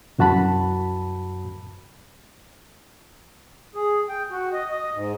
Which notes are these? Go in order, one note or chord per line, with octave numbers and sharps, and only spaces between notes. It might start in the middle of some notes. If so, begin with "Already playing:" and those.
C2 F#2 F#4 A5 B5
G#4
G5
F#4
D#5
D#5
G#2